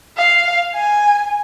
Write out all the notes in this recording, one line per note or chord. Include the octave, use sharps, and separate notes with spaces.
F5
G#5